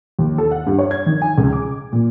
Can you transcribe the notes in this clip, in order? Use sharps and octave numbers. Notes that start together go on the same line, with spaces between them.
D#2
A4
F#5
G2
C#5
G#6
D#3
G#5
C#2
D6
A#2